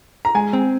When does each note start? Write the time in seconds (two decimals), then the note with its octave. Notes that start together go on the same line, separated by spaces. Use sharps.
0.25 A#5
0.35 G#3 G#5
0.53 C4